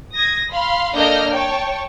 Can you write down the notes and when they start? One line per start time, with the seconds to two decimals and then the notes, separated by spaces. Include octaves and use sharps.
0.14 D#6 G#6 A#6
0.51 F5 B5 C6
0.96 A#3 D4 A4 D#5 F6 G6
1.32 C#5 G5 A5 C#6